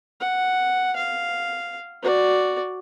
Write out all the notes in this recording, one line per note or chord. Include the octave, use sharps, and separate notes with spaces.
F#5
F5
F#4 D5